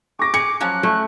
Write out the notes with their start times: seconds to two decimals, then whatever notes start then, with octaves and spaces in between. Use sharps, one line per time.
0.19 C#6 D6 A#6
0.34 G#4 C#7
0.61 F3 F#3 C#4 F#6
0.83 A3 E4